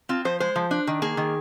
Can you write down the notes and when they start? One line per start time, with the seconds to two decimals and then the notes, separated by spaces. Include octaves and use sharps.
0.09 C4 F4
0.25 F3 C5
0.40 G#3 C5
0.56 F3
0.71 D4
0.87 D#3
1.02 A#3 G#4
1.17 D#3